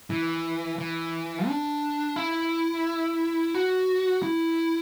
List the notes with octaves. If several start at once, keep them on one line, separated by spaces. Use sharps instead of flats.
E3
E3
D4
E4
F#4
E4